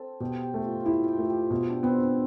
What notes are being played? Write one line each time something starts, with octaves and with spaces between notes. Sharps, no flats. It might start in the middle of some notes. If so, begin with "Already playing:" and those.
Already playing: C4 A4
B2 G4
G4
A3
F4
F4
E4 G4
F4 G4
A3
G4
B2 E4
D4
B3 C4
D4